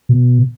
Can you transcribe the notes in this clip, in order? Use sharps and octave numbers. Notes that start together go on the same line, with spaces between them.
B2